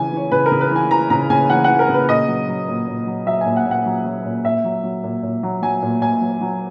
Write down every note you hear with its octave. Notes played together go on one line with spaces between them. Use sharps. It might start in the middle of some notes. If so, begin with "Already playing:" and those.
Already playing: C#3 E3 G#5
E3 C#5
C#3 B4
A#4
C#3
B4
E3 G#5
E3 A#5
C#3 A#5
C#3 G#5
E3 F#5
E3 F#5
A#4
C#3
B4
A#2 D#5
F#3
F#3
A#2
A#2
F#3
F#3 E5
G#5
A#2
F#5
A#2
F#5
F#3
F#3
A#2
A#2 E5
F#3
F#3
A#2
A#2
F#3
F#3 G#5
A#2
A#2 G#5
F#3
F#3